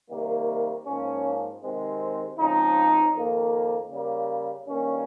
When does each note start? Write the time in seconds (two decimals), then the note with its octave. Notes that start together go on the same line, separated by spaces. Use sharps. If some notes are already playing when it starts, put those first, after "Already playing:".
0.10 C3 D#3 G3 A#3
0.86 G#2 F3 A#3 C#4
1.62 C3 D#3 G#3 C4
2.37 C#3 F3 G#3 C4 D#4
3.14 F2 D#3 A#3
3.90 C#3 G3 A#3
4.66 G2 D#3 A#3 C#4